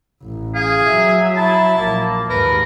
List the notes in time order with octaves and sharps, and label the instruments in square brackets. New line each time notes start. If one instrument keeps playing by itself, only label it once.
[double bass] A1
[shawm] G#4 [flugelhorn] F5
[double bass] F#3 [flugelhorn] E5
[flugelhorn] E4 [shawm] A5
[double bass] A#1 [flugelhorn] A#3
[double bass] D#2 G#2 [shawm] A#4 [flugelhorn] B4